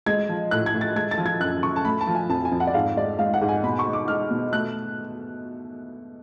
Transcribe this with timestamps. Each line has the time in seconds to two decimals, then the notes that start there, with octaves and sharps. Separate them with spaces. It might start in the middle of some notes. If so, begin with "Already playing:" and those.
0.06 G#3 G#6
0.29 F3
0.51 A2 F#6
0.66 G#6
0.74 A2
0.81 A6
0.96 G#3 G#6
1.11 A6
1.18 F3
1.26 G#6
1.40 F#2 F#6
1.63 F#2 C#6
1.76 A5
1.85 A3 B5
2.01 A5
2.07 F3
2.15 G#5
2.29 F2 A5
2.45 G#5
2.52 F2
2.60 F#5
2.67 D5
2.74 G#2 F5
2.96 G#3 D5
3.19 G#3 F5
3.34 F#5
3.42 G#2
3.49 G#5
3.64 B2 B5
3.79 C#6
3.87 G#3
3.93 D6
4.08 G#3 F6
4.31 B2
4.52 A3 F#6